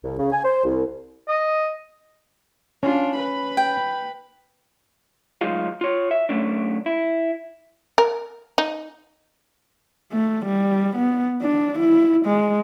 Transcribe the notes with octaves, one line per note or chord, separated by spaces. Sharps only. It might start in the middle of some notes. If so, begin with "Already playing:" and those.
C2
C#3
G#5
C5
C2
D#5
C#4 D4 F4
B4 B5
G5
D2 F#3 G#3 D#4 F4 F5
F4 C#5
E5
F#2 A3 C#4 D4
E4
A#4
D#4
A3
G3
B3
D4
E4
G#3